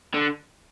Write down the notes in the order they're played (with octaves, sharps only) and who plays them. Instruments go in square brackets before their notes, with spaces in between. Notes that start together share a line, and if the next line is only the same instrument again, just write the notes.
[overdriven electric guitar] D3